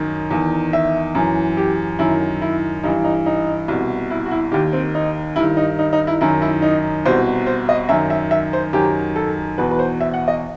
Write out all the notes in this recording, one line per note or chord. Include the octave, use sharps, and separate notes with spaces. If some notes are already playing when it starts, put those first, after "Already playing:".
Already playing: F#2 D#3
E2 D#3
E5
F#2 E3
G4
F#2 D#3 E4
E4
G2 E3 D#4
D#4
D#4
C2 B2
E4
F#4
E4
D#2 D#3 G4
C4
D#4
G2 D#3 E4
D#4
D#4
D#4
E4
F#2 D#3 E4
E4
D#4
C2 B2 C5
C5
D#5
F#2 D#3 E5
E5
E5
C5
F#2 D#3 G4
A4
E2 B2 B4
B4
C5
E5
F#5
D#5